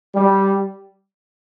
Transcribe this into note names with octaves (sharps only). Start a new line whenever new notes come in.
G3